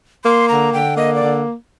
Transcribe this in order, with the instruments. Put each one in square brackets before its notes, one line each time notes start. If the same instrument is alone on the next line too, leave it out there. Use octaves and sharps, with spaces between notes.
[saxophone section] A#3 [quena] C6
[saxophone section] D3 [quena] A#5
[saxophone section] D3 [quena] G5
[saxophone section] A#3 [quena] D#5
[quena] D5
[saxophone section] D3